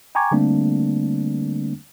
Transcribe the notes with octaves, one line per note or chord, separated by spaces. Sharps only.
G5 G#5 A#5 C#6 D6 G#6
D3 G3 A3 A#3 C4 D4